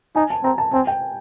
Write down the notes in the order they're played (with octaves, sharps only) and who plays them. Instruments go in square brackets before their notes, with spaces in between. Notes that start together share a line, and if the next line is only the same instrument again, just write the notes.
[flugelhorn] D#4 [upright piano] G#5
[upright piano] A5
[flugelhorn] C4 [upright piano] A#5
[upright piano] A5
[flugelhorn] C4 [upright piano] G#5
[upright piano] G5